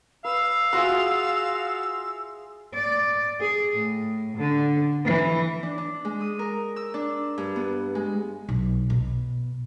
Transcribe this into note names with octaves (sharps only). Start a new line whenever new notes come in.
B4 F5 E6
F4 F#4 G#4 E5 C6
D5
G#4
A2
D3
E3
D4
D4
G#3
D#6
A#4
E6
D4
G2
B3
G#3
B1
B2